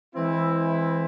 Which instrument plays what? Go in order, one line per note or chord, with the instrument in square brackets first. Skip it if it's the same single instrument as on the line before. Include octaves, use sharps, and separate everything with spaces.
[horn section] E3 G#3 C4 E4